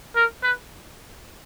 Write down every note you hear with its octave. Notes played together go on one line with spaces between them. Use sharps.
A#4
B4